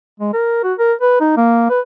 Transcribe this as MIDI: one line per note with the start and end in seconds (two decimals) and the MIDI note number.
0.20 0.32 56
0.34 0.61 70
0.64 0.74 66
0.79 0.93 70
1.01 1.20 71
1.21 1.37 63
1.37 1.66 58
1.70 1.80 71